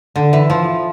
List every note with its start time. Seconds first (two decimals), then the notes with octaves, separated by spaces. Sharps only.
0.16 D3
0.33 E3
0.50 F3